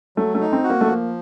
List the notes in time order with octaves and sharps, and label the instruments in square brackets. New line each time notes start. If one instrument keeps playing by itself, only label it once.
[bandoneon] F#3 [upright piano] A3
[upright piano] A3
[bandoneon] D#4
[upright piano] C4
[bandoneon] F#4
[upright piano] A#3
A3
[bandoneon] F3 [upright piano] A#3